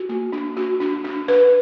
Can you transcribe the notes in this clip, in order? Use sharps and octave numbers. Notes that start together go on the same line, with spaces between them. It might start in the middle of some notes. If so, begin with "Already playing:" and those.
Already playing: F#4
A#3
D4
F#4
D4
D4
B4